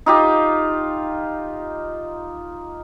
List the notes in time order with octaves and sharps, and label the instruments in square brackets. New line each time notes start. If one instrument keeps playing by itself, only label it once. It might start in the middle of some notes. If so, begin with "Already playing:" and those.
[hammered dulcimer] D#4 F4 G4